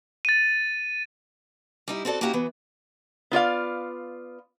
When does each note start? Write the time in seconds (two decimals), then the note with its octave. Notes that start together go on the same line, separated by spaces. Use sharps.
0.25 A6 D#7
1.88 G3 D#4 E4
2.05 C4 F#4 A4 D5
2.21 A#3 C#4 E4 F#4 G4
2.33 E3 F#3 B3
3.31 B3 F4 D5 F5